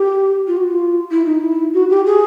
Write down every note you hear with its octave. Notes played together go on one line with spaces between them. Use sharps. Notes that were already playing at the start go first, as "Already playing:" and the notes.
Already playing: G4
F4
F#4
F#4
F4
E4
D#4
E4
F#4
G4
G#4